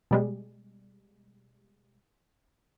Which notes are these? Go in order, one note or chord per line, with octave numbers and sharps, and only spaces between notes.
B2 G3 G#3